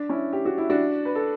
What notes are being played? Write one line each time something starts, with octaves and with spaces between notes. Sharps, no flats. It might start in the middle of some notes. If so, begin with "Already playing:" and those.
Already playing: D4
C#4 E4
G4
F#4
E4
D4 F#4
B4
A4